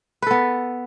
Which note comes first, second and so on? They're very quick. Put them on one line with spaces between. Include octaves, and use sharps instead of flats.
B4 A4 B3